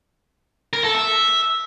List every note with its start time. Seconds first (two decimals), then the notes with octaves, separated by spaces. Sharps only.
0.73 A#4
0.84 A4
0.94 E5